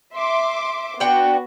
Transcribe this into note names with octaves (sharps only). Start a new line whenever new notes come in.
E5 C6 D6
B3 D4 F#4 F#5 G5